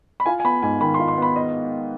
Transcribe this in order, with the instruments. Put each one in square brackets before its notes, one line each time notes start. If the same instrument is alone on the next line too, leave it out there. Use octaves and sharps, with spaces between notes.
[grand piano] B5
[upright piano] F4 [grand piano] G#5
[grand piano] G#5
[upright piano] B3 [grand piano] B5
[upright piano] G#2 [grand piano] G#5
[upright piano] D#3 [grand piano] B5
[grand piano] C6
[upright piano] F4
[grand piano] C6
[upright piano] B3 [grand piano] B5
[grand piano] D#5